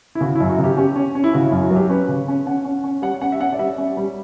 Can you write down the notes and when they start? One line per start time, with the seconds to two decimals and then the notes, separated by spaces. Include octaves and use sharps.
0.15 E4
0.20 C#3 F#4
0.35 E4
0.40 F#2
0.49 F#4
0.59 C#3 G4
0.77 C#4 G4
0.96 C#4
1.15 C#4
1.24 E4
1.33 C#3 F#4
1.48 F#2 E4
1.63 F#4
1.71 F#3
1.76 G4
1.89 C#4 B4
2.08 C#3
2.28 C#4
2.46 C#4 F#5
2.65 C#4
2.84 C#4
3.02 G3 F#5
3.21 C#4 F#5
3.32 E5
3.40 C#4 F#5
3.53 D5
3.59 G3 E5
3.78 C#4
3.97 G3